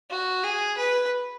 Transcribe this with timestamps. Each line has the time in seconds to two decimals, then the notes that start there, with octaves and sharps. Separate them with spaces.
0.10 F#4
0.44 G#4
0.78 B4